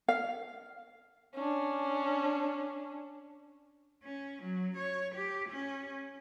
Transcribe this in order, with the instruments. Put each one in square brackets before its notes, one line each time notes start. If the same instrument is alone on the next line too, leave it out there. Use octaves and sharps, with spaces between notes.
[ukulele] F5
[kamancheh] C#4 D4
[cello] C#4
F#3
C#5
G4
C#4